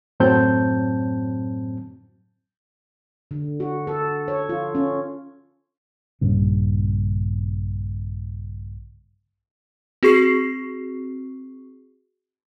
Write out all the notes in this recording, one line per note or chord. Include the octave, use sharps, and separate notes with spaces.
F#2 A2 F#3 C4 A5 G6
D3
F#4
A4
C#5
F4
C#4
A#1 G2 C#3
C4 F#4 G#4 C#6 C7